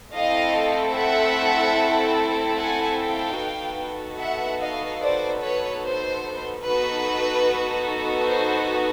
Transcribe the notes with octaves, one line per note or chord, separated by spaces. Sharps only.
A3 C4 E4 A4 D#5 F5
E5 F#5
F#5 G#5
F5 G5
B3 D#4 F#4 A4
E5 F#5
D#5 F5
C5 D5
B4 C#5
C5
B3 D#4 F#4 A4 B4
C5